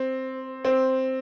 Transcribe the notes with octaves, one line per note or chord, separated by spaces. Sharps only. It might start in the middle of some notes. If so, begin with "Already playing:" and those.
Already playing: C4
C4